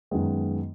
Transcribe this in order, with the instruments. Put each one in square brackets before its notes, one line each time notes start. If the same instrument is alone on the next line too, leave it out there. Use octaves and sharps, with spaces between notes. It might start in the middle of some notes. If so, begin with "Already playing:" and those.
[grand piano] F#2 D#3 G#3 B3